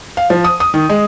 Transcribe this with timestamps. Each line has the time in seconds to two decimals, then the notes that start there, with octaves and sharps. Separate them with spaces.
0.17 F5
0.30 F3
0.44 D#6
0.60 D#6
0.74 D#3
0.89 G#3